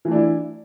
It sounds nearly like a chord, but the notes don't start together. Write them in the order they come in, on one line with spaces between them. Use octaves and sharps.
E3 A3 D4 E4